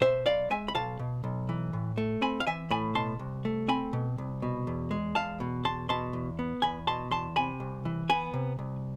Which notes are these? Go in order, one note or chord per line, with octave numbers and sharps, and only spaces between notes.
B2 C5 E5
B1 D5 F5
G#3 E5 G#5
B5
B1 F5 A5
B2
B1
E3
A2
A3
C4 G#5 B5
F5
E3 E5 G#5
A2 G#5 B5
B2 A5 C6
C2
A3
C4 G#5 B5
B2
C2
B2
E2
G#3
E2 F5 A5
B2
E2 A5 C6
B2 A5 C6
E2
B3
E2 G#5 B5
B2 A5 C6
E2 A5 C6
C3 G#5 B5
C2
E3
B3 G#5 B5
C3
C2